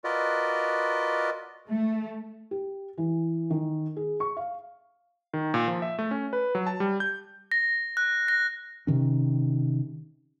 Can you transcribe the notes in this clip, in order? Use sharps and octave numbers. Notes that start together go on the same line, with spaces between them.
F4 F#4 A#4 B4 D5 D#5
A3
G4
E3
D#3
G#4
C#6
F5
D#3
A#2
F3
E5
A3
C#4
B4
F#3
A5
G3
G6
A#6
F#6
A#6
C3 D#3 C#4